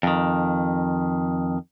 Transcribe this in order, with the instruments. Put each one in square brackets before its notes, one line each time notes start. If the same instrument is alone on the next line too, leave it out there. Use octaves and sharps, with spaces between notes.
[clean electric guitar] F2 D#3